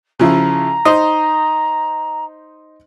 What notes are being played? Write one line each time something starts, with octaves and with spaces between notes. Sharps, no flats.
C#3 F3 E4 A#5
D#4 C5 D#5